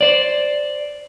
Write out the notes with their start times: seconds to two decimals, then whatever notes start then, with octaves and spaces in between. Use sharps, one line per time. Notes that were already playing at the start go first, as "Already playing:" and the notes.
0.01 C5 D5